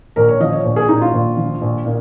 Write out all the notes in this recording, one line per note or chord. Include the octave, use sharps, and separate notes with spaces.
A#1 A#4
C#5
F3 D#5
C#5
A#1
G#4
A#2 D#4
F4
A#1
F3
A#1
A#2